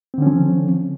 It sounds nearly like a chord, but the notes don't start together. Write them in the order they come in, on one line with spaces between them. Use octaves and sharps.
C4 D3 C#4 F3